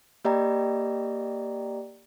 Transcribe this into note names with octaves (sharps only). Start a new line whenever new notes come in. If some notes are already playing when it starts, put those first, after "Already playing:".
A#3 G4 D5 D#5 G5 A#5